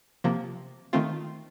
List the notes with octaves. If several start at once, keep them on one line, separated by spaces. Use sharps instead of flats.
C3 F3 A#3
D#3 A3 C4 F4